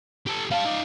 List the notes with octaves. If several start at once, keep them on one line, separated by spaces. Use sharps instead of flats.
G4 A4
G3 F5 A5
D#4 D5